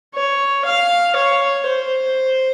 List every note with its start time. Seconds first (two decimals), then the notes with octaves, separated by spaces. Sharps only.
0.15 C#5
0.66 F5
1.17 C#5
1.67 C5